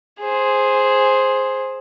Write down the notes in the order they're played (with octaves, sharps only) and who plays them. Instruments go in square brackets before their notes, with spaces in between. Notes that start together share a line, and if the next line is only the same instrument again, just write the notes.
[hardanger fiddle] G#4 C5